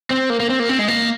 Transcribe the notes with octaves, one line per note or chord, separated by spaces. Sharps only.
C4
A#3
A#3
C4
A#3
C4
G#3
A#3